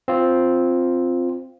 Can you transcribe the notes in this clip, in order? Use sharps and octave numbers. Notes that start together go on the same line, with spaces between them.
C4 F4